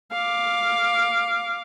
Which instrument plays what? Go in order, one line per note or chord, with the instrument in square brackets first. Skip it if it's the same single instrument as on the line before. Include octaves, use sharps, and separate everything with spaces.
[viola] F5 D6